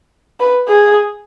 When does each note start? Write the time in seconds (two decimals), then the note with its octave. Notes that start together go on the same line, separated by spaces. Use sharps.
0.40 B4
0.68 G#4